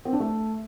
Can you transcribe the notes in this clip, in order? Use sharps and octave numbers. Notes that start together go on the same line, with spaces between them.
C4
D4
A3